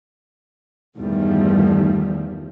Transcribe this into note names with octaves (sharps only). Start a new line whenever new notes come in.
E2 G2 D#3 F3 G3 A3